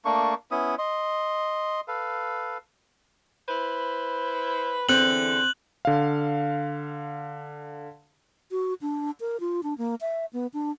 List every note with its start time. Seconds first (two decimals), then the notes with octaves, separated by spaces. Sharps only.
0.05 A3 A#3 D4 C#6
0.51 B3 C#4 E4 D#6
0.79 D#5 C6
1.88 A4 B4 F5
3.48 E4 B4 C5
4.89 E2 D3 E3 C4 F#6 F#7
5.85 D3 F5
8.51 F#4
8.81 D4
9.20 A#4
9.40 F4
9.63 D4
9.78 A#3
10.01 E5
10.33 B3
10.54 D4